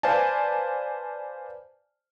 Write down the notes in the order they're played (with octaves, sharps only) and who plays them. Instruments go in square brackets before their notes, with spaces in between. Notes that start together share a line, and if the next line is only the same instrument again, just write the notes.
[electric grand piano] B4 C5 D5 F5 G#5 A5